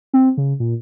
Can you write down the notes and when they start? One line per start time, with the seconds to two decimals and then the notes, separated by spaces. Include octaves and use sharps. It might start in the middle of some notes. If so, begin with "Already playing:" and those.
0.14 C4
0.37 C#3
0.60 A#2